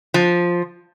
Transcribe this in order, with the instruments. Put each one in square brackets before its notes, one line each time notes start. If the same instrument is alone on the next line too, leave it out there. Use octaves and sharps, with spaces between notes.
[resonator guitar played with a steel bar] F3